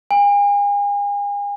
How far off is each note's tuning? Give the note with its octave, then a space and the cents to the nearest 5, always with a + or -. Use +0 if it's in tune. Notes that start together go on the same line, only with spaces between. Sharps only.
G#5 -40